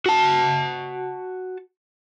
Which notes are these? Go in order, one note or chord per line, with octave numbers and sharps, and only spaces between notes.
F#4 A5